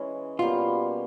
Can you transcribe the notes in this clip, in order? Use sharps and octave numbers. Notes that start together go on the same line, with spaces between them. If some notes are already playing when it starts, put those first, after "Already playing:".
Already playing: E3 G#3 C#4
B2 G3 A#3 F4